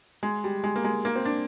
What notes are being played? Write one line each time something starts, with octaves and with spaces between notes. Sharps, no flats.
G#3
G3
G#3
A#3
G#3
A#3
C4
D4